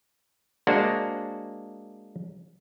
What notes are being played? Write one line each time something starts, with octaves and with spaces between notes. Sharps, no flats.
G#3 A#3 D4 F#4 C5